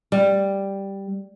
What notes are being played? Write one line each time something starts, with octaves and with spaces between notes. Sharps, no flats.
G3